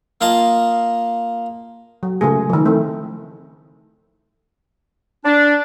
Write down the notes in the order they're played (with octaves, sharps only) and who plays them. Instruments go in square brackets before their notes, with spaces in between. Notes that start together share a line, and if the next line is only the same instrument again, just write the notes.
[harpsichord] A#3 F4 D#5 A5
[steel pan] F#3
C#3 G#3 A3 G#4
D#3 F3
A3 C4 E4
[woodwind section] D4